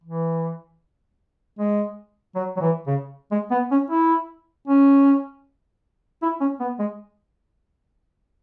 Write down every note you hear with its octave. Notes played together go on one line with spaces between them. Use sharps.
E3
G#3
F#3
F#3
E3
C#3
G#3
B3
C#4
E4
C#4
E4
C#4
B3
G#3